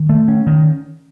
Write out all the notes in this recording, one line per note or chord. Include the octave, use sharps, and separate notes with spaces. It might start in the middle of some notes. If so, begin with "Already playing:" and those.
Already playing: D#3
A3
C#4
D#3